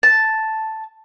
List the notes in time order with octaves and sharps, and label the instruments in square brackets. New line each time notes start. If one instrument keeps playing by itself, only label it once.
[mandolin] A5